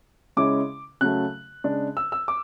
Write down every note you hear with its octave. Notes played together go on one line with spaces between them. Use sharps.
C#3 G#3 C#4 E4 D6
C#3 F#3 A3 F#6
C#3 G#3 D4
E6
E6
D6